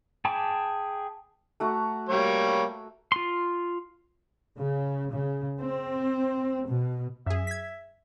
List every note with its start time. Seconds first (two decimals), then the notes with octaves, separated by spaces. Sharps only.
0.25 G#4 G5 A5 B5 D6
1.60 A3 F#4 A#5
2.09 G3 A#3 C#5
3.12 F4 C6
4.57 C#3
5.12 C#3
5.60 C4
6.67 B2
7.26 F#2 G#4 E5
7.47 G#6 B6